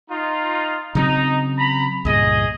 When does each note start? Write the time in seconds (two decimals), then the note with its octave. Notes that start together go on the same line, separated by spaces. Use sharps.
0.10 D#4 F4
0.95 C#3 F#3 C4 D#4
1.58 A#5 B5
2.05 C#2 G2 A#2 G#4 D#5